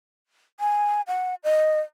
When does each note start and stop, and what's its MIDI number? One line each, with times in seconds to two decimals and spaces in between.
0.60 1.01 80
1.07 1.35 78
1.44 1.80 75